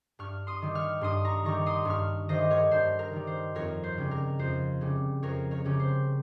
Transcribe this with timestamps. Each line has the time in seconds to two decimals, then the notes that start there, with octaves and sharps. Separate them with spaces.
0.19 G2 C#6 F6
0.47 C6 D#6
0.62 D#3 G3
0.75 C#6 F6
1.01 G2 C6 D#6
1.25 A#5 C#6
1.45 D#3 G3 A#5 C#6
1.66 C6 D#6
1.85 G2 C#6 F6
2.29 D#3 G3 C5 D#5
2.50 A#4 C#5
2.71 G2 C5
2.99 A#4
3.13 D#3 G3
3.27 C5
3.55 F2 A#4 C#5
3.84 C5
3.97 C#3 G3 C#4
4.11 A#4
4.39 F2 C5
4.81 C#3 G3 C#4
5.23 F2 A#4 C#5
5.51 A#4 C#5
5.65 C#3 G3 C#4
5.79 C5